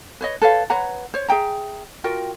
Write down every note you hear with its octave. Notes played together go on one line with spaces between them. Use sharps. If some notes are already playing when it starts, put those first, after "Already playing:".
B4 C#5 D#5
A4 B4 C#5 F5
B4 C#5 F#5 A#5
C5 C#5
G#4 E5 G5 A#5
F4 F#4 A#4 G5